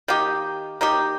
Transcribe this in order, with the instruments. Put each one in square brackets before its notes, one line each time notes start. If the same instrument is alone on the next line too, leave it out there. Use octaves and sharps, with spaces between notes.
[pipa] D#3 A#3 D#4 G4
D#3 A#3 D#4 G4